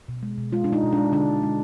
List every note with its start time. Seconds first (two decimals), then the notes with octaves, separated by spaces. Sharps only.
0.08 B2
0.23 G#3
0.38 B2
0.52 G#3 F4
0.64 D4
0.67 G#3
0.73 D#4
0.83 B2
0.93 D4
0.98 G#3
1.12 D3 D4
1.28 D3
1.43 G#3